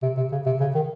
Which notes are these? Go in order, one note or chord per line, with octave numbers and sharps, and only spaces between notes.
C3
C3
C#3
C3
C#3
D#3